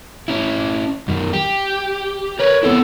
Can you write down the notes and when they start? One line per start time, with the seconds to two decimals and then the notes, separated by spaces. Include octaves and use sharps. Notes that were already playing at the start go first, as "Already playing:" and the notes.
0.28 C#4 E4
1.08 F#2 D#3
1.33 G4
2.39 A#4 B4 C#5
2.63 B3 C4 E4 A4